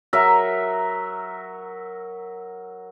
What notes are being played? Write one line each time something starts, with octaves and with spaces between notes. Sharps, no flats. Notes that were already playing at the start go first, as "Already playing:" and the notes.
F#3 A#4 E5